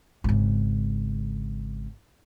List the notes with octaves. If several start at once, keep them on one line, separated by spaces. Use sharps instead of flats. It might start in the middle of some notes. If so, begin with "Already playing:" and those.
G#1 C#3